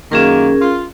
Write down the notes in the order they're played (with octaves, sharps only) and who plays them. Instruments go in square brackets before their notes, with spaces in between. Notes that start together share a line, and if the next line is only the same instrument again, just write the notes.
[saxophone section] F#2 D#3 A#3 [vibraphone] C#4 G#4 A#4
[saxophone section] F4